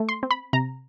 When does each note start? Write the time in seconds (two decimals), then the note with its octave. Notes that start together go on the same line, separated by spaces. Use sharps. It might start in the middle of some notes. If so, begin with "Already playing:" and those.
Already playing: A3
0.09 C6
0.23 C4
0.31 B5
0.53 C3 A#5